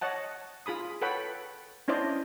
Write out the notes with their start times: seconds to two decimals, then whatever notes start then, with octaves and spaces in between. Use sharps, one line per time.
0.01 C#5 D#5 F#5 A5
0.66 F4 G#4 B5 D#6
1.02 A4 B4 C#5 F#5 G5 B5
1.88 C#4 D4 E4 C5 D5 D#5